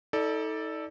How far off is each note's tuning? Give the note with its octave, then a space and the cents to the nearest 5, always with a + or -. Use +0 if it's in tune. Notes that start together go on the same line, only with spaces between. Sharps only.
D#4 +40 A4 +0 D5 +0